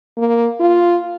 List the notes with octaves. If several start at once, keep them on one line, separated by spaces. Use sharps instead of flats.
A#3
F4